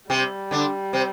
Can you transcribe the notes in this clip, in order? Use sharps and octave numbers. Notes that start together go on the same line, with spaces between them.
C3 G3 C4
D3 D4
C3 C4